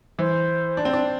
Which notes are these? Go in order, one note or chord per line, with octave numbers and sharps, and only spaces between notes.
E3 C5
D4
C4
D4